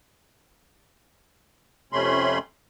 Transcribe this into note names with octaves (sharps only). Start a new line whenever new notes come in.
F2 C3 A3 C#4 B5 C6